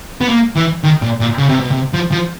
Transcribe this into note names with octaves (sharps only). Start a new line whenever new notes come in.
B3
A#3
E3
D#3
A#2
A#2
C#3
C3
B2
C3
F3
F3